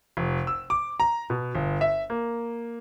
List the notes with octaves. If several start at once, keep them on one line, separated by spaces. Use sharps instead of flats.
F1
E6
D6
A#5
B2
G1
E5
A#3